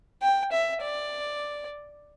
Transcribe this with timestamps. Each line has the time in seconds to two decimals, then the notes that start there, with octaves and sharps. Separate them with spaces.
0.22 G5
0.52 E5
0.82 D5